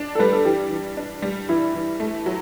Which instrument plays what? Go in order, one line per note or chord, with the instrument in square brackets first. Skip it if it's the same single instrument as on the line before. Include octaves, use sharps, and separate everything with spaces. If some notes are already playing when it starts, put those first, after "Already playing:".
Already playing: [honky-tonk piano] D4
[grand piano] A4
[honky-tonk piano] G3 [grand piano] B4
[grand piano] A4
[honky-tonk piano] E3 [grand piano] G4
[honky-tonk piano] E3
D4
G3
[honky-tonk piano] E3 [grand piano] E4
[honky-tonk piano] E3
A3
F#3